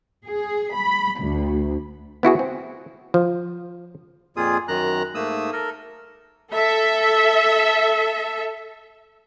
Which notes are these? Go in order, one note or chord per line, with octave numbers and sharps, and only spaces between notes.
G#4
B5
D2
B3 E4 F#4 G#4
C4
F3
F2 A#2 A#3 F4 G#4 D#6
F#2 D#3 A#5 F#6
G#2 A3 A#3 D#6 E6
A4 A#4
A4 E5